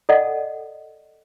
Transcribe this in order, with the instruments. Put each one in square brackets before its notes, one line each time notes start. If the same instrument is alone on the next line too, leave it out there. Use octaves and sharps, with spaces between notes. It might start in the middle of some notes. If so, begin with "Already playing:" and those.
[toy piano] A4 D5 D#5 F#5 G5